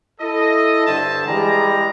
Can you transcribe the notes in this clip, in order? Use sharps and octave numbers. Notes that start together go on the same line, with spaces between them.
E4 A4 D#5
G2 D3 G3 C5 E5 A5
E3 G3 G#3 G#4 A#5